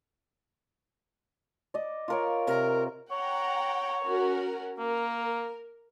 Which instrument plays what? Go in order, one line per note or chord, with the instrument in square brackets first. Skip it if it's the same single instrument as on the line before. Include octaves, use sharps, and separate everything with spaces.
[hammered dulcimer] D5 D#5
F4 A#4 C#5
[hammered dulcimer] C3 [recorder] A#4
[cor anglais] C#5 [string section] F#5 G5 A#5
[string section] C#4 F#4 A#4
[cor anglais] A#3 [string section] A#4